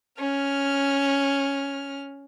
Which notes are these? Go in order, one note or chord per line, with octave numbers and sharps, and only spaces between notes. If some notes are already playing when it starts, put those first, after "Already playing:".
C#4 F6